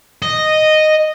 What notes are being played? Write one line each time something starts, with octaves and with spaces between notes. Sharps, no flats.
D#5